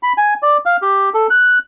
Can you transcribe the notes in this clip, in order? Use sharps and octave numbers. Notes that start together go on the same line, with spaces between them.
B5
G#5
D5
F5
G4
A4
F#6